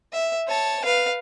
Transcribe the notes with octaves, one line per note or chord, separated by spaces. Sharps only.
E5
C#5 A5
B4 F5